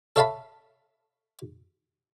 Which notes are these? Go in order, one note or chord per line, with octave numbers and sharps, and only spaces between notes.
A4 C#5 E5 F5 A5 B5